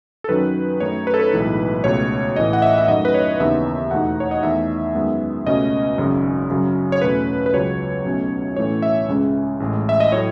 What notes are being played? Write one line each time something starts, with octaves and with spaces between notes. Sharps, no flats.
A4
F#2 D#3 F#3 C#4 B4
F#2 D#3 A3 D#4 C#5
B4
A4
B4
B1 A2 E3 G#3
C#2 B2 A3 C#5
A1 A2 E3 D#5
F#5
E5
E5
F#2 D#3 A3 D#5
B4
C#5
D#2 C#3 E3 B3 D#4 E5
E2 B2 A3 D#4 F#5
C#5
D#5
E2 D#3 A3 E5
F#2 D#3 G#3 B3
C#2 B2 A3 C#4 D#5
G#1 F#2 C#3
F#2 C#3 F#3
C#5
E2 B2 A3 C#4 B4
B4
C#2 C#3 F#3 C#5
B1 B2 A3 C#4
A2 E3 A3 C#4 C#5
E5
C#2 C#3 G#3 C#4
A1 A2 G#3
E5
D#5
A2 F#3 A3 C#5